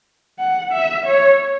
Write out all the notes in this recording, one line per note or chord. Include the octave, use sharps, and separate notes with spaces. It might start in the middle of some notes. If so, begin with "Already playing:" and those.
F#5
E5
C#5